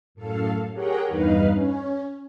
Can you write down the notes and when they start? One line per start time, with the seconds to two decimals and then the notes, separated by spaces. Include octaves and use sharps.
0.15 F#2 A2 A4 F5
0.73 G4 G#4 A#4 C#5 F#5 G5
1.07 E2 G2 D#4 B4 F5
1.52 C#4